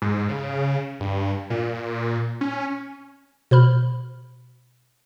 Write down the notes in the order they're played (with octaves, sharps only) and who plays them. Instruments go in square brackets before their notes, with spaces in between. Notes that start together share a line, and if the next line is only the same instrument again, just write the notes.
[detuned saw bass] G#2
C#3
G2
A#2
C#4
[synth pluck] B2 C5 B5 F6